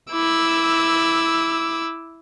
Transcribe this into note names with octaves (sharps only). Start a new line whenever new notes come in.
E4 D6 E6